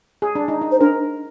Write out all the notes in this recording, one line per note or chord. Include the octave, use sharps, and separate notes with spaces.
G#4
D4
D#4
D#4
C5
D4 A#4